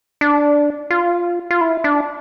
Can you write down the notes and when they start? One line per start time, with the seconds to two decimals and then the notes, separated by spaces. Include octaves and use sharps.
0.21 D4
0.90 F4
1.51 F4
1.61 E4
1.84 D4